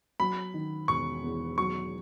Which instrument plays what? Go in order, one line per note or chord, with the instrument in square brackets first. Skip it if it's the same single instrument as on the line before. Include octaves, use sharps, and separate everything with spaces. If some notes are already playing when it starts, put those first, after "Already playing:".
[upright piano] F#3 [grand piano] B5
[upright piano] D#3
[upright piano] E1 [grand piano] C#6
[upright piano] E2
[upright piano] F#3 [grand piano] C#6